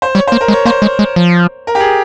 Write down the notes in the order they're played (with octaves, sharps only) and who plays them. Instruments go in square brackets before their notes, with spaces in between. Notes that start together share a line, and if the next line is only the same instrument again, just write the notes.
[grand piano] C5
[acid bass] G3 [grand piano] C#5
[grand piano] C5
[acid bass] A#3
[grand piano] A#4
[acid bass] G#3
[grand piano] C#5
[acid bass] A#3 [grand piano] C5
[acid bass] G#3
G#3
F3
[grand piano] A#4
G4
G#4